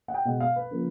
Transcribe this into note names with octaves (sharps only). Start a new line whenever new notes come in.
F#5
G5
B2 G#3 B3 F#5
F5
B4
C#3 F3 A#3